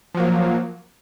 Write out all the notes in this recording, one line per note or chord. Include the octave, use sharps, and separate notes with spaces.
F3 F#3 A#3